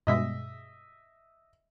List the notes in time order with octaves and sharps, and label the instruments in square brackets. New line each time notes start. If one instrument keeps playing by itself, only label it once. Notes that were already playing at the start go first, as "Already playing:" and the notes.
[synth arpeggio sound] G2 B2 G#3 [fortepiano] D#5 E5